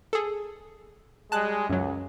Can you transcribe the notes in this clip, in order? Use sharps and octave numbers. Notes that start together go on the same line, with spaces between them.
G#4 A4
G3 G#3 A5 F#6
C#2 F#2 F#3